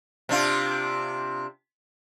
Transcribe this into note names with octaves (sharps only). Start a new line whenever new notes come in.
C3 D4 F4